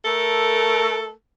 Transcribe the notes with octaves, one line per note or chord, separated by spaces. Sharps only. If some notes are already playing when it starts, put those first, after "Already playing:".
A3 A4 A#4